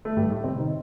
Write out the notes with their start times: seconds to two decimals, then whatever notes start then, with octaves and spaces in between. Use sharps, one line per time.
0.05 A3
0.17 G2 G3
0.30 A2 A3
0.44 C3 C4
0.58 D#3 D#4